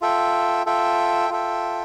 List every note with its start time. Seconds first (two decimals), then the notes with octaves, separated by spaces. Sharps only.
0.01 F4 A4 E5 G5
0.66 F4 A4 E5 G5
1.30 F4 A4 E5 G5